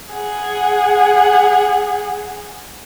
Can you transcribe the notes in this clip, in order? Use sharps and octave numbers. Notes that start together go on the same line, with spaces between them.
G#4 F#5